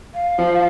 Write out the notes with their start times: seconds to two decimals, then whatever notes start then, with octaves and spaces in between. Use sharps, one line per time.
0.14 F5
0.38 F3